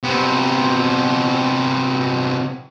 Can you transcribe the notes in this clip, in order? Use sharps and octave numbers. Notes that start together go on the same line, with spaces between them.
C3 B3